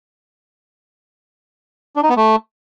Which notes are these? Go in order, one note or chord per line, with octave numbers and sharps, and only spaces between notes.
D4
D#4
B3
A3